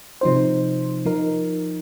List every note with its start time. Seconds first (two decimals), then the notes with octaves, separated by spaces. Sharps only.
0.21 C3 F3 D#4 C5
1.05 F3 D#4 A#4